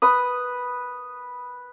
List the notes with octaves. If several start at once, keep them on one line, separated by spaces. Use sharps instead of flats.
B4 B5 D#6